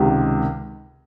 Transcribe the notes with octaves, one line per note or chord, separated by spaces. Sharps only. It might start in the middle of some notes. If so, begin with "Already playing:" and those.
Already playing: C#2 C3 D#3